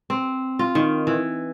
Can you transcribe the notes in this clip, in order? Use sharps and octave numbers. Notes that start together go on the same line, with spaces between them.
C4
F4
D#3
E3